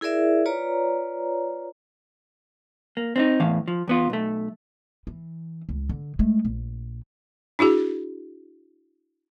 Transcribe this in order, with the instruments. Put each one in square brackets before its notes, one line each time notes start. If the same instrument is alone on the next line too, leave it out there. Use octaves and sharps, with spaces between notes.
[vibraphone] E4 G#4 A#4 D5 E5
F4 B4 C#5 D5 A#5
[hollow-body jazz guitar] A#3
C4 D4 D#4
E2 A2 E3 F5
F3
E2 B3 F4
B1 A3
[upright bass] E3
C#2
D3
G#3 A3
A#1
[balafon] D4 E4 F#4 G#4